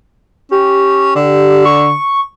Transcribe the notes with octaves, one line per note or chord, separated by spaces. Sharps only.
C#4 G4
D3
C#6